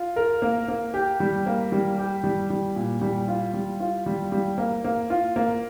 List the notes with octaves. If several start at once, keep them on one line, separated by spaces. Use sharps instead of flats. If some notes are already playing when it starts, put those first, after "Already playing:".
Already playing: F4
A#4
A#3
A#3
G4
G3
A#3
G3
G4
G3
G3
A#2
G3
F4
G3
F4
G3
G3
A#3
A#3
F4
A#3